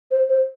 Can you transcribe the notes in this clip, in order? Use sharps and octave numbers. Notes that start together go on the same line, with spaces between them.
C5
C5